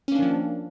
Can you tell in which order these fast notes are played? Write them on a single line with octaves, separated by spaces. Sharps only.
C#4 A#3 D4 D#3 F3